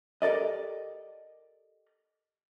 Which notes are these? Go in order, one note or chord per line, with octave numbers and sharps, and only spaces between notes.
G4 A4 A#4 D5 D#5